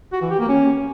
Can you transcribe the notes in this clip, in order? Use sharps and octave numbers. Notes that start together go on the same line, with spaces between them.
F#4
E3
G4
A#3
C#4